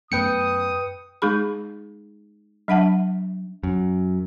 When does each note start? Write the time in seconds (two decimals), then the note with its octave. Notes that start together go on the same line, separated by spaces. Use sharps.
0.12 F#2 A3 B3 B4 G5 D#6 C#7
1.22 G#3 D#4 G#4 B5
2.68 F#3 D4 E5 F#5 A5
3.63 F#2